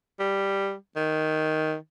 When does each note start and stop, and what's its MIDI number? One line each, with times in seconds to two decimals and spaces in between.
0.20 0.74 55
0.96 1.75 51